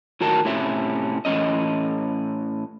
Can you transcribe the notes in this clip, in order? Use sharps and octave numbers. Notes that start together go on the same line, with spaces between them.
A2 D#3 F#3 F#4 A#4 A5
A2 C3 C#4 E5
A2 E3 G#3 C#4 D#5